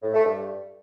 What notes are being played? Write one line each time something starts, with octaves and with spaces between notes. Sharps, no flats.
A2
A3
G2